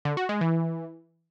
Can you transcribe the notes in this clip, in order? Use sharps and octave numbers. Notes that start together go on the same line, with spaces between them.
D3
F#4
G#3
E3